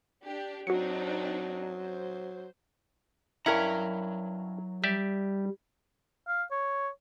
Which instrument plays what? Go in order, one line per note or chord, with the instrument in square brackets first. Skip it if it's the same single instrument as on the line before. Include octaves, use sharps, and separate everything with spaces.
[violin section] D4 G4
[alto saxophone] F#3 [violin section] C4 D4 D#4 [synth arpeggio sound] F#4 C#7
[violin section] C5
[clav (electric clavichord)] G2 C#4 F#5 [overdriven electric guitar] F#3 A#5 [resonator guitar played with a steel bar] E4 A#4
[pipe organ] G3 [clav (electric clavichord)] G4 D5 E5
[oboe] F5
C#5